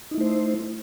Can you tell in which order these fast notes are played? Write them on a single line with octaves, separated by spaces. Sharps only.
D#4 E4 A3 C5